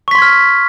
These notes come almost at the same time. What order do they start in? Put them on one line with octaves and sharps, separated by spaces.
C#6 B6 C6 G#6 F6